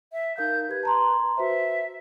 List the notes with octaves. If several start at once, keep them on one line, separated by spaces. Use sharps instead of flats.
E5
D#4 A#4 F5 G6
G4 B4 G#6
A5 A#5 C6
F#4 B4 C5 E5